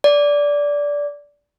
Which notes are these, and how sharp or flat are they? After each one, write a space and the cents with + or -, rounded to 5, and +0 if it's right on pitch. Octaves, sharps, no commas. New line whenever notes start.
D5 -15